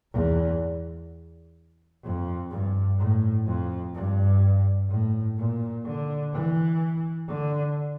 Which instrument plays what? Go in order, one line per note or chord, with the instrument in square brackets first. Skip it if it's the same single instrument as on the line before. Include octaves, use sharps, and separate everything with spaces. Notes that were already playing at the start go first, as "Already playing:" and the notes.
[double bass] E2
F2
G2
A2
F2
G2
A2
A#2
D3
E3
D3